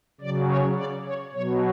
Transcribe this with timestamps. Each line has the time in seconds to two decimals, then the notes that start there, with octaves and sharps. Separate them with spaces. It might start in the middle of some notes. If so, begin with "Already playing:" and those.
0.21 C#3 F#3 D5
0.48 C#5
0.76 D5
1.05 C#5
1.33 B2 F#3 C#5